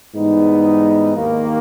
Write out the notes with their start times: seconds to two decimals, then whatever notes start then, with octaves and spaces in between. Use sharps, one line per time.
0.15 G#2 E3 G3 B3 D#4
1.15 D#2 D#3 A#3